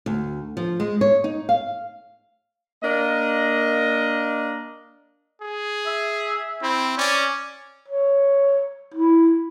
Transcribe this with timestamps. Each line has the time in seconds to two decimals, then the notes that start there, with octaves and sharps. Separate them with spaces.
0.06 D2
0.57 F3
0.80 G#3
1.01 C#5
1.24 D#4
1.49 F5
2.83 A#3 D4 A#4 D#5
5.42 G#4
5.86 E5
6.63 C4 E4
6.98 C#4 D5
7.88 C#5
8.94 E4